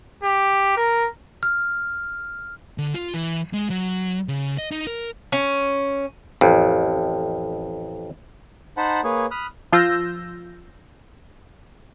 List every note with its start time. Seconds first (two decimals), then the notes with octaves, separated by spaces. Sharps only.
0.23 G4
0.77 A#4
1.43 F6
2.78 D3
2.94 F4
3.14 E3
3.53 G#3
3.70 F#3
4.28 C#3
4.58 D#5
4.71 D#4
4.87 A#4
5.32 C#4
6.41 A1 F2
8.77 D#4 C5 F#5 A5 B5
9.04 A#3 G#4 B4 C#5
9.31 B5 D#6 F6 F#6
9.72 F3 F4 E6 G6 A#6